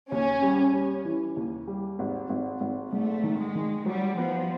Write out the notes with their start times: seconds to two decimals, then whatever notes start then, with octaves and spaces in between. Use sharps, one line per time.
0.11 D#2 C#4
0.42 G3
0.73 G3
1.05 E3
1.36 D#2
1.67 G3
1.99 G#1
2.29 G#1
2.61 G#1
2.92 G#2 A3
3.23 D#3
3.39 G#3
3.55 D#3
3.86 F#3 G3
4.17 F3 B3